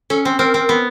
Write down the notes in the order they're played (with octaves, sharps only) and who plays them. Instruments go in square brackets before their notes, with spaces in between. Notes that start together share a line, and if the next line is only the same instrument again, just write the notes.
[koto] C#4 [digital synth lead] A4
[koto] C4
[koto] C4 [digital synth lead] A#4
[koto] C4
B3